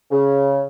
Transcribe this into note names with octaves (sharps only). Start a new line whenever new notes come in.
C#3